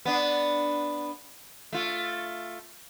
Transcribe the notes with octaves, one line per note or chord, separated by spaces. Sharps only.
B3 D4
A3 F4